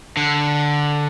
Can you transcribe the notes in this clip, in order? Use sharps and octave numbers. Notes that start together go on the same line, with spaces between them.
D3